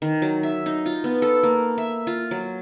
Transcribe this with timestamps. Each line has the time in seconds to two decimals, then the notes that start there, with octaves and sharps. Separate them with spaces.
0.02 D#3
0.22 F#3
0.43 E5
0.66 D#4
0.86 F4
1.04 B3
1.22 A4
1.43 A#3
1.78 E5
2.07 F4
2.31 F#3